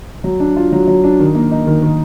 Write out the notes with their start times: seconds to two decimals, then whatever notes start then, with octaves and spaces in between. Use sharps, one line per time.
0.24 F#3
0.40 D4
0.57 F4
0.72 F#3
0.87 F#3
1.04 D4
1.20 D#3
1.35 A#3
1.51 D#4
1.67 D#3
1.82 D#3